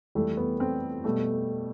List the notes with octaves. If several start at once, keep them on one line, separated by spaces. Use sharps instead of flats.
F2 E3 G3 A3
B3
C4
B2 G3 A3